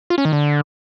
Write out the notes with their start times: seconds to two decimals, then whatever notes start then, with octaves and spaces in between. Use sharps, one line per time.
0.10 F4
0.18 C#4
0.25 D#3
0.33 D3